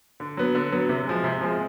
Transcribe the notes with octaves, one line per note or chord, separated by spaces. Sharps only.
D3
F#3 B3
D3
F#3 B3
C3
F3 G#3
C3
F3 G#3